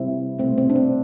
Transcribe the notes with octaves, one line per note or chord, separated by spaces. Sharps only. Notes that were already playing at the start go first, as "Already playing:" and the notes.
Already playing: C3 G3 C4 E4
B2 A3 C4
C4
D4
C4